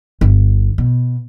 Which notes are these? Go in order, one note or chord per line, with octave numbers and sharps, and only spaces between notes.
G1
B2